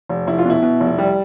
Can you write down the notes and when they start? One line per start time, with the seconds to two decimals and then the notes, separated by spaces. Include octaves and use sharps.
0.09 F1
0.27 F1 E4
0.39 F4
0.45 B2 E4
0.62 B2
0.80 F1
0.98 G3